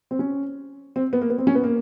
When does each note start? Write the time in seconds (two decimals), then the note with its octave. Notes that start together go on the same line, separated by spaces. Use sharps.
0.11 C4
0.19 C#4
0.96 C4
1.13 B3
1.22 A#3
1.30 B3
1.38 C4
1.47 C#4
1.55 B3
1.64 A#3